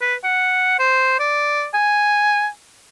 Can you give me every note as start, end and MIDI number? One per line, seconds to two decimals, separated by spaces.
0.01 0.15 71
0.24 0.78 78
0.79 1.17 72
1.19 1.66 74
1.74 2.48 80